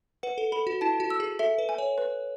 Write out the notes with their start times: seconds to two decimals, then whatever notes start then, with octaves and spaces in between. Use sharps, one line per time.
0.23 B4 F#5
0.38 A4
0.52 A4 B5
0.67 F#4
0.81 E4 A5
1.00 F#4
1.10 E6
1.20 G#4
1.39 A4 E5
1.58 B4
1.69 G#5
1.78 C#5
1.98 B4